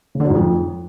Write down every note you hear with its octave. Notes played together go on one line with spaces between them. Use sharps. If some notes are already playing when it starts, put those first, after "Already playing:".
C#3
D3
F#3
G#2
F2